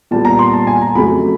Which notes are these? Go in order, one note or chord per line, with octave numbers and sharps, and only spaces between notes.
A#2 G3 B3 A5
A#5
C6
A5
G#5
A#5
F2 C#3 F#3 A3 B5